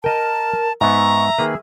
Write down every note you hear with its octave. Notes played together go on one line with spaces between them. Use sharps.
A#4 D#5 G5 A5
G#2 B3 E5 A#5 C#6
D#3 A#3 G#4 B4